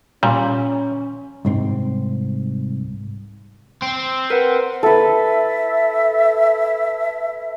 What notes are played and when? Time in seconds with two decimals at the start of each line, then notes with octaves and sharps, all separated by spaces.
0.23 A#2 G3 C#4
1.45 C2 G#2 C4
3.82 C4
4.30 A#4 B4 F#5
4.83 A4 B4 E5